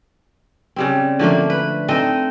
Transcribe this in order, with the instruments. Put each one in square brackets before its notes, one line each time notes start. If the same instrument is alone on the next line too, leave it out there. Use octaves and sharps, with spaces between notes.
[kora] C#3 G3 C4
D3 F3 A3 A#3
B4
C4 D#4 A4 D#5